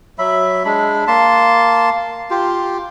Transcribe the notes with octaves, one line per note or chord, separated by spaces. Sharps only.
F#3 E5 B5
G#3 D4 B5
A#3 A5 C6
F4 G4